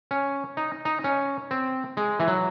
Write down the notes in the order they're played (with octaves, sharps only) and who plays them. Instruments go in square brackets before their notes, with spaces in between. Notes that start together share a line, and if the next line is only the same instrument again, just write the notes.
[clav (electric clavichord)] C#4
D#4
D#4
C#4
C4
G#3
E3
F#3